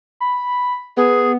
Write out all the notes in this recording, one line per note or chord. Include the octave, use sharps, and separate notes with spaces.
B5
B3 G#4